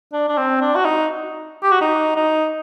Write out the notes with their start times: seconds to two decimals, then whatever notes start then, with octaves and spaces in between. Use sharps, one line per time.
0.13 D4
0.29 D4
0.37 C4
0.61 D4
0.75 F#4
0.85 D#4
1.63 G4
1.72 F#4
1.81 D#4
2.16 D#4